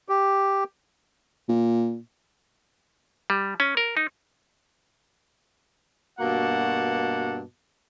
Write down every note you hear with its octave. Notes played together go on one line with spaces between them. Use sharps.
G4
A#2
G3
C#4
A#4
D#4
G2 B2 A#3 F#4 F#5 A5